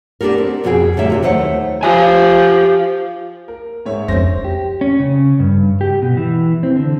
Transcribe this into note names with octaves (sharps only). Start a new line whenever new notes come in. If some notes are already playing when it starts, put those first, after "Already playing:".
B3 D4 F#4 G4 A4 A#4
C4
F2 B2 C4 F#4 G#4 G5
A2 D3 G3 A#3 C#5 E5
C3 F4 G4
D#2 D#3 A3 C5 C#5 F#5
F3 G4 G#5
A#4
G#2 C#5 E5
F2 C#3 D4 C5 A#6
G4
C#4
C#3
G2
G4
B2
E3
C4
D3